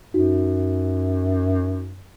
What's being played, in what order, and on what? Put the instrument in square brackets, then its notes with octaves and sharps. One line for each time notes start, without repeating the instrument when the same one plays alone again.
[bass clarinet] F#2 [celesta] D#4 F#4